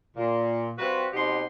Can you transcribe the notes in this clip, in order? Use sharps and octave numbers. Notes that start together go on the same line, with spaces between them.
A#2
G3 C4 F4 F#4 B4
B2 C4 D#4 G4 F#5 C6